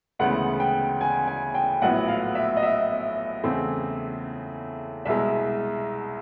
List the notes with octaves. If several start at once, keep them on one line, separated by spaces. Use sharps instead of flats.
D2 C#3 E3 G#3 B3 F#5
G5
G#5
G#5
G5
A#1 A2 F#3 B3 F#5
F5
E5
D#5
E5
E2 C#3 E3 A3 C4
C2 B2 G#3 E5